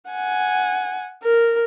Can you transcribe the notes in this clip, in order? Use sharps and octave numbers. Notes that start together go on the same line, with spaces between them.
F#5 G#5
A#4